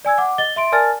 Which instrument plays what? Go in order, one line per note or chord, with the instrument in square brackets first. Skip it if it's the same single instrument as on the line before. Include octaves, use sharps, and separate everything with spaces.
[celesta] D5 G#5 E6 G#6
F#5 D6
D#5 A6 G7
E5 C6 D7
A#4 D5 G#5 A5 F6 A6